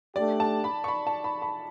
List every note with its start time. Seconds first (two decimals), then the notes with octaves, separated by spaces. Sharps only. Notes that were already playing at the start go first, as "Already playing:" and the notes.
0.15 A3 D4 G4 D5
0.40 A5
0.64 B5
0.84 C#6
0.88 B5
1.07 A5
1.24 B5
1.42 B5